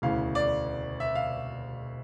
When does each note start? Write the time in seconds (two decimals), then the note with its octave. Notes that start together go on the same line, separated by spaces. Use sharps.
0.02 E1 D2 C#3 E3 F5
0.35 D5
1.00 E5
1.15 F5